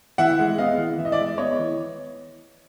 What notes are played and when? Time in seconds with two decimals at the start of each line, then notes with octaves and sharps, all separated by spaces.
0.18 E3 E5 F#5
0.39 G#3
0.58 B3 D#5 F5
0.78 E3
0.98 E3 E5
1.05 D#5
1.12 D5 E5
1.19 G#3
1.38 B3 C#5 D#5
1.59 E3